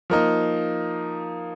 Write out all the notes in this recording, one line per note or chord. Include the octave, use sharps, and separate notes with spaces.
F3 A#3 D#4